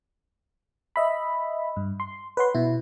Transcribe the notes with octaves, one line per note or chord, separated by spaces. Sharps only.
D#5 E5 B5
G2
C6
B4 C#5 F#5 C6
B2 E4